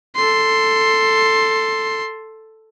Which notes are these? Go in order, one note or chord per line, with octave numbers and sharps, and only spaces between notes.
A4 C6